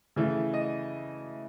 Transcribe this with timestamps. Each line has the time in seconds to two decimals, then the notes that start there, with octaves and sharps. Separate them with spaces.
0.16 C#3 E3 A3
0.54 D#5